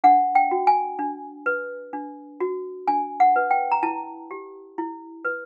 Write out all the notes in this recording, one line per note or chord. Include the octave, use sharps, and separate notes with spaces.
D4 F#5
G5
F#4
G#5
D4
B4
D4
F#4
D4 G#5
F#5
B4
G5
A#5
E4 A5
G4
E4
B4